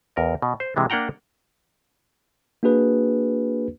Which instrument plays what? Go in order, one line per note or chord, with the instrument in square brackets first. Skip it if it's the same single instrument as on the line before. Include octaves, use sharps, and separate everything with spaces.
[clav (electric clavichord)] E2 A#4 D#5
B2
C5
C3 E3 G#3 D4
A#3 D4 F#5 G5 A#5
[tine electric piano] A#3 D4 F#4 G#4 B4